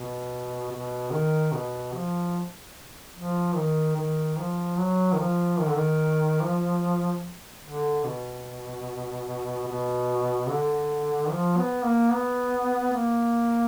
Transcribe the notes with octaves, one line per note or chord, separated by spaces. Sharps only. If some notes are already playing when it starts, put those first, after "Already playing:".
Already playing: B2
B2
D#3
B2
F3
F3
D#3
D#3
F3
F#3
D#3
F3
D#3
D3
D#3
F3
D3
B2
B2
D3
F3
B3
A#3
B3
A#3